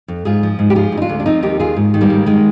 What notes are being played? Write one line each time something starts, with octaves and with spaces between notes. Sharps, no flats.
F2
G#2 F4 G#4
F3
G#2
G4
F3 F4 G#4
D2
D#4
D4 F4
D2
D4
F3 C4 D#4
D#2 D#4 G4
D#2 F4 G#4
G#2
D#3
G3 A#3
G#2
D#3 G#3